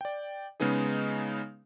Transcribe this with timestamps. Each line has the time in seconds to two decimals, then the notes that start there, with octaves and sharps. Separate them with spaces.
0.01 D5 G5
0.60 C#3 G#3 B3 D#4 G#4